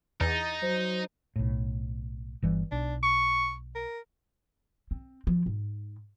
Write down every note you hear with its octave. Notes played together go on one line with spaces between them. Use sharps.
E2 D#4 A6
F#3 C5
B1 A2
G1 E3 G3
B1 D4
C#6
A#4
C4
F3
G#2